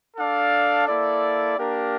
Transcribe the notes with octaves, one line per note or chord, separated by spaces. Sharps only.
D4 A4 D5 F5
A#3 E4 A4 D5
A#3 D4 G4 A#4